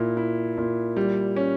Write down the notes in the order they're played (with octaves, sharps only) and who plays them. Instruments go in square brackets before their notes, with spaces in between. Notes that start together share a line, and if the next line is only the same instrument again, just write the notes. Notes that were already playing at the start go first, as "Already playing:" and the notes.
Already playing: [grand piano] A#2 E4
E4
A#2
G3
C#4